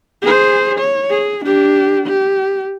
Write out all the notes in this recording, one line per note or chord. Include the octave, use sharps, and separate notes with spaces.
G#4 C5
C#5
G#4
D4 G4
G4